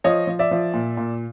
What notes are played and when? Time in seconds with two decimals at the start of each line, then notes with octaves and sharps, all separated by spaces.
0.04 F3 C#5 D#5
0.27 F3
0.39 D5 E5
0.51 F3
0.74 A#2
0.97 A#2